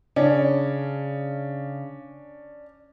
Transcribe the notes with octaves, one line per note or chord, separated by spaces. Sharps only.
C#3 C#4 D4